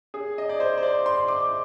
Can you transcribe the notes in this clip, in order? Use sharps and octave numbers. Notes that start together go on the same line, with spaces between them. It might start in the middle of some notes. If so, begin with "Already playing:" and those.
G#4
D#5
D5
C5
C5
D5
C6
D6